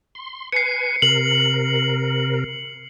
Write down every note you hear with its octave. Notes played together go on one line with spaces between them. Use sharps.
C6
B4 G#5 C7 C#7
C3 A#4 F#7